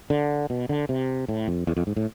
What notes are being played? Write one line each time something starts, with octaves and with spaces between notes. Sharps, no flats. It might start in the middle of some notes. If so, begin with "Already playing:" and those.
D3
B2
D3
C3
A2
F2
E2
F2
G#2
A2